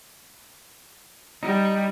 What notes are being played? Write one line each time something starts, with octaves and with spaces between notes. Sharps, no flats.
G3 D#4